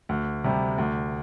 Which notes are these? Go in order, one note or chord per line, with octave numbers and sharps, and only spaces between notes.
D2
C3 G3
D2